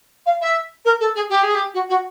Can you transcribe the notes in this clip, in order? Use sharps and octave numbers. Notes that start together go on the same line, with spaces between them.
F5
E5
A#4
A4
G#4
G4
G#4
G4
F#4
F#4